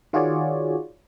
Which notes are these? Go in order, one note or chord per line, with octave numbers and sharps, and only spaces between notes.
D#3 F4 F#4 G#4 C#5 D5